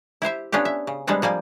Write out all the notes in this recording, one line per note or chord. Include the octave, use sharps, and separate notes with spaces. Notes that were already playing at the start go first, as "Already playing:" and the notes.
E4 G4 C5 E5
B3 C#4 D4 F4 G4
E5
C#3
G3 G#3 B3 C4 D4
F3 G3 A#3 G#5